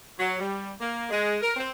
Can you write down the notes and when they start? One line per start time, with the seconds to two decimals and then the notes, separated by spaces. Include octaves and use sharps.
0.19 F#3
0.40 G3
0.80 A#3
1.10 G#3
1.42 A#4
1.56 C4